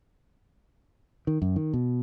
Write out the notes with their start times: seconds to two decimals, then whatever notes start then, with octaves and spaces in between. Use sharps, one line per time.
1.27 D#3
1.42 F#2
1.56 D#3
1.73 B2